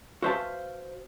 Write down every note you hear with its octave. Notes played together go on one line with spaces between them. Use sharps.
F#4 B4 C5 E5 F5 A5